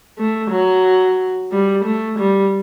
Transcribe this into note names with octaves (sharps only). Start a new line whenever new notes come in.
A3
F#3
G3
A3
G3